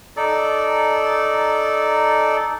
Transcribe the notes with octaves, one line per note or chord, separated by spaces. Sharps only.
D#4 A4 D5